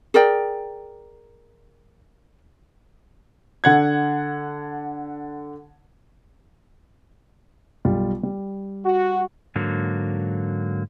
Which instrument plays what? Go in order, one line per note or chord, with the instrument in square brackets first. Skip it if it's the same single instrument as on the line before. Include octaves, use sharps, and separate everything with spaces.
[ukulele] G#4 A#4 D5 G5
[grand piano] D3 F#5 G#6
B1 G3 F4
G3
[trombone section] F#4
[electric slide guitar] G#2 D3 F#3 A#3